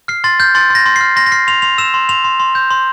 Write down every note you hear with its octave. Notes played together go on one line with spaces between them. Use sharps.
F6 C7
C6 A6
F6 G6
C6 A6
C6 A#6
C6
F6 C7
C6 A#6
A#6
F6 C7
C6 F7
C6 F7
E6 E7
C6
C6 F7
C6
C6
G6
C6